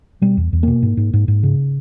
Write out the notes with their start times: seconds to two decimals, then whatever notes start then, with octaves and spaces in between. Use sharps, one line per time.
0.21 B2 G3
0.37 E2
0.53 E2
0.63 B2 A#3
0.83 G#2
0.97 G#2
1.13 G#2
1.28 G#2
1.43 C#3